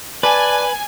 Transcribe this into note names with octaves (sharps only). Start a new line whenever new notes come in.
B4 D5 G#5 A5 F#6